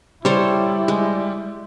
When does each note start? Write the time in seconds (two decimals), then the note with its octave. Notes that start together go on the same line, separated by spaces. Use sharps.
0.25 G3 E4 A4 C5 C#5
0.88 G#3